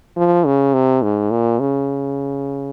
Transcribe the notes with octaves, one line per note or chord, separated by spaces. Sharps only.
F3
C#3
C3
G#2
A#2
C#3